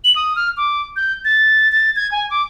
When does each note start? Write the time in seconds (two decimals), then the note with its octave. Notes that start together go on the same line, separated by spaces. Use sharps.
0.04 F#7
0.16 D#6
0.36 F6
0.57 D6
0.96 G6
1.25 A6
1.72 A6
1.96 G#6
2.12 G#5
2.30 D6